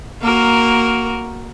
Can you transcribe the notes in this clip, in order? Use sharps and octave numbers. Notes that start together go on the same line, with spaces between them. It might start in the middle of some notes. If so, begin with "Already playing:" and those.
A#3 F#4 A#4